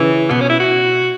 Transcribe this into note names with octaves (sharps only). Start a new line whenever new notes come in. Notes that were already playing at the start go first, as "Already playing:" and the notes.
Already playing: C#3 E3
B2 B3
C#4
E4
F#4